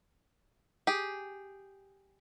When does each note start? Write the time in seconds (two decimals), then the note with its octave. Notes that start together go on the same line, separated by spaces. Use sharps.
0.87 G4 G#4